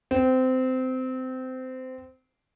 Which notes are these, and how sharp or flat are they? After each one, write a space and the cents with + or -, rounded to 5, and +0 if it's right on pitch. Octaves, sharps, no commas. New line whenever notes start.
C4 -20